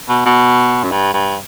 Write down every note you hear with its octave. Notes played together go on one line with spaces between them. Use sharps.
B2
B2
F#2
G2
G2